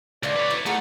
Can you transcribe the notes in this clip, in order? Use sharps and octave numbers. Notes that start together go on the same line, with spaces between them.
C#2 D3 E3 C4 D5
B4 C#5
E4
A3 F4 G#4 A#4 F#5